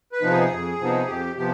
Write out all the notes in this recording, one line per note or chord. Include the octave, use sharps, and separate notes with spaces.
B4
C3 F3 B3 D#4
G#4
F2
C3 F3 B3 D#4
F2 G4
C3 F3 B3 G4